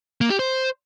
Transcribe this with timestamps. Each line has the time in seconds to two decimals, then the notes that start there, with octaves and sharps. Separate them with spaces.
0.21 A#3
0.30 G4
0.39 C5